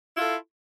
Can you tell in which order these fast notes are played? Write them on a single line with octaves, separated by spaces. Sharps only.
E4 F4 A4